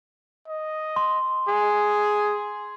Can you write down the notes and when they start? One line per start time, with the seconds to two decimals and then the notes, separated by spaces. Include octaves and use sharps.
0.48 D#5
0.96 C6
1.48 G#4